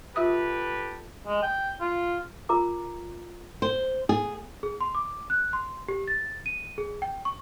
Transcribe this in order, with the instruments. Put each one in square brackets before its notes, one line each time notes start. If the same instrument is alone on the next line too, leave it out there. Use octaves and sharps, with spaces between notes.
[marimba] F4 E5 D#6 [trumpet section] G4 A4 B4
[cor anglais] G#3
G5
F4
[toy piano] F4 A#4 A#5 D6
[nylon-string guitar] C5
G#4
[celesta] G#4
C6
D6
F#6
C6
G4
A6
D#7
G#4
G5
C#6